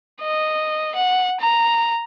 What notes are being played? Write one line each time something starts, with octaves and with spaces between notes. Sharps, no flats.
D#5
F#5
A#5